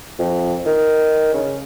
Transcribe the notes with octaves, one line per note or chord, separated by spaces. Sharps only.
F2
D#3
C#3